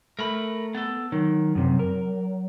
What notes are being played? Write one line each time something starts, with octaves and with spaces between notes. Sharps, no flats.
A3 A#4 B5
B3 A4
D#3 F#3
F#2 C3
A#4